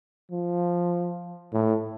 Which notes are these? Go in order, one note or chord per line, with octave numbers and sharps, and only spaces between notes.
F3
A2